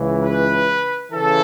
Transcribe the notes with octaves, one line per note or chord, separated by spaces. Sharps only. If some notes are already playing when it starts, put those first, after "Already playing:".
Already playing: C#2 C#3 E3
B4
C#3 E3 A4